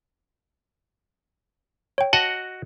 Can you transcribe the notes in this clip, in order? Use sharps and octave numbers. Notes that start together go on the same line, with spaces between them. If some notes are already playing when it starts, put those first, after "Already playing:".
C#5 G5
F#4 D#5 F#5 A5